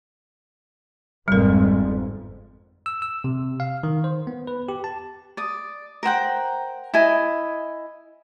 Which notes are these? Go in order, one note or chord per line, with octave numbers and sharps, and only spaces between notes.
G1 F2 G#2 G3 A#4
E6
E6
C3
F5
D#3
C5
B3
B4
G4
A5
D5 D#6
A#4 C5 F#5 G5
E4 D#5 G#5